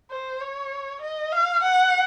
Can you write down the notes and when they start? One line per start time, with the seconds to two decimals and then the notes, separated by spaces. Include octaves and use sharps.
0.10 C5
0.41 C#5
1.01 D#5
1.32 F5
1.63 F#5